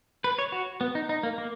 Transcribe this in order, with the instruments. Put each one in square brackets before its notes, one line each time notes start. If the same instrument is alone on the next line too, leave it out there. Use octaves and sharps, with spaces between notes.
[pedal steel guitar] B4
C#5
F#4
B3
D#4
D#4
A#3
A#3